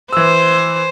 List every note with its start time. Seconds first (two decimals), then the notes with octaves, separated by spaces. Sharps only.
0.13 E3 C5 E6